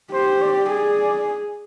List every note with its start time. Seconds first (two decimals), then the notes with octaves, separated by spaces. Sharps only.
0.13 G4 C5
0.42 D5
0.70 G#4